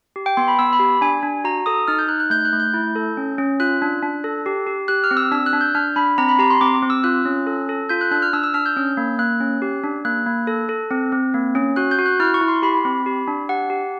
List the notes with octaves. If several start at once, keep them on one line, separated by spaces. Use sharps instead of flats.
G4
G5
B3 C6
B5
B3 E6
B5
G4
D4 G#5
D4
F#4 A#5
A4 D#6
D#4 F6
G6
D#4 F#6
F#6
A3 G6
F#6
A3
G6
E4
A4
C#4
C#4
F4 F#6
D4
D4
A4
G4
G4
G4 F#6
F6
C4
E6
D4 E6
F#6
D4
G6
D4 F6
D4 B5
C4 A#5
B5
G4 A#5
C6
C4 D6
C4
E6
F4 F#6
C#4
A4
A4
F4 G6
F#6
D4 F#6
F6
D4 E6
E6
D4 F6
G6
C#4
A#3
A#3 F#6
C#4
G4
D4
A#3 F#6
A#3
A4
A4
C4
C4
A#3
C#4
F#4 F#6
G6
F#4
F#6
E4 F6
C#6
E4
C6
G4 B5
C4
G4
D4
G4 F#5
G4